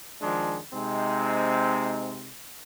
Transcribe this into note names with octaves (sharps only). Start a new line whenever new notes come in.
D#3 F3 G#3 D4
C3 G#3 C4 D#4